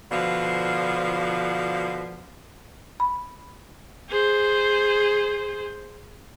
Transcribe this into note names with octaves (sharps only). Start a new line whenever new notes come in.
B2 D3 F3
B5
G#4 C5